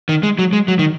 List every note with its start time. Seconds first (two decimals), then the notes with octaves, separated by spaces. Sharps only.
0.09 D#3
0.23 G#3
0.39 F#3
0.53 G#3
0.68 F#3
0.79 D#3